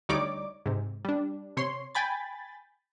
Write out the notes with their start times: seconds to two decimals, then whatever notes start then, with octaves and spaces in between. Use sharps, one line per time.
0.09 D2 G3 D#4 C#5 D5 D6
0.66 G#2 C3
1.05 G3 D4
1.57 C3 C#5 C6
1.95 G5 G#5 B5 A6